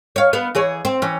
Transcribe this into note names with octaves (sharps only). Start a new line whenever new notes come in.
C#5 F5
B3 F5
E3 G#4 C#5
C4
E3 C#4